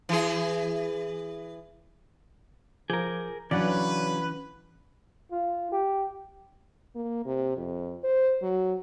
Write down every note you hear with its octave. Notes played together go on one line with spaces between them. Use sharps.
E3 G#4
F3 G#4 A#4 D6 G6
C#3 E3 F#3 C#4 D4 B4 D5 F#5
F4
G4
A#3
C3
F2
C5
F#3